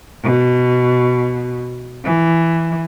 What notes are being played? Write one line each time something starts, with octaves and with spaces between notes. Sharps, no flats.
B2
E3